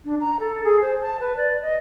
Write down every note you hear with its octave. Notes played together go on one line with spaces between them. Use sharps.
D4
A#5
A4
G#4
C5
A5
B4
D5
D#5